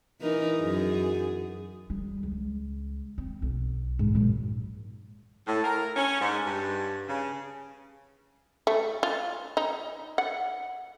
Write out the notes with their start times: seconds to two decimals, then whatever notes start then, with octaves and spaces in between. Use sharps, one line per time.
0.21 E3 D#4 A#4
0.59 F#2 G#4
1.90 G3
2.23 C#2
3.18 C4
3.42 B1
3.99 G#2
4.15 A#2 F#3
5.47 A2
5.64 A#4
5.96 C#4
6.20 G#2
6.46 G2
7.07 C#3
8.67 A3
9.03 F4
9.57 D#4
10.18 F#5